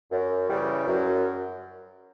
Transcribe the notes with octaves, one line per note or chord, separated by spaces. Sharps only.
F#2
C#3 E3 G3
F#2